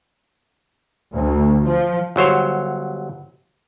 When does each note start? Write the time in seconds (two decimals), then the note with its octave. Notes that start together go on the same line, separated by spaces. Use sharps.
1.13 D2
1.66 F3
2.16 G1 F#3 C5 C#5